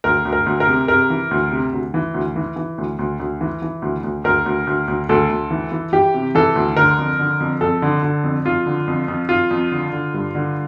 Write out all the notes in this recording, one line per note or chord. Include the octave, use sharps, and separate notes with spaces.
D2 A#4
D2
A#4
D2
A#4
C3
C3 A#4
E3
D2
C3
D2
E3
D2
E3
E3
D2
D2
D2
E3
E3
D2
D2
D2 A#4
D2
D2
D2
D2 A4
D2
E3
E3
E3 G4
C3
E3 A4
D2
D3 A#4
F2
D3
F2
F2 A4
D3
D3
F2
F2 F4
D3
F2
F2
F2 F4
F2
D3
D3
G2
D3